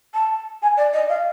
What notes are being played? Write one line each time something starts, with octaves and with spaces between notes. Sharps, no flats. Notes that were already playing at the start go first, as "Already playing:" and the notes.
A5
G#5
D5
D#5
F5